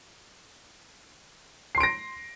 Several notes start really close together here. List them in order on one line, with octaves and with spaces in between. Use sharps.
C7 C6 D7 A#6